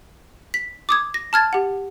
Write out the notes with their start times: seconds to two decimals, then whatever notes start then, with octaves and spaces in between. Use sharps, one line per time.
0.54 B6
0.89 D6 D#6 G#6
1.14 A#6
1.33 A5 F6 G#6 A6
1.53 G4 F#5